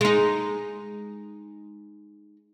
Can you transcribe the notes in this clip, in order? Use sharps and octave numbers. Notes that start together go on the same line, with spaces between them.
G#3 D#4